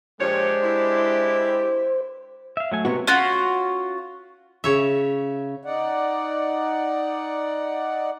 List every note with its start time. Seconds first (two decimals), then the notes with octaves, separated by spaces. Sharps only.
0.20 A#2 F3 G#3 D4 G4 C5 C#5
0.63 E4
2.57 E5 F5
2.72 F#3 A3 G#5
2.85 C3 G#3 B3 F#4 A#4 C#5
3.07 C#4 F4 F#4
4.64 C#3 C#5 E5
5.63 D#4 D5 F#5